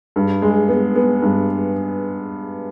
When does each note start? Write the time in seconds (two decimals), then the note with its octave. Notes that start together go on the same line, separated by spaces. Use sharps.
0.16 G2
0.42 G#3
0.68 B3
0.96 B3
1.22 G2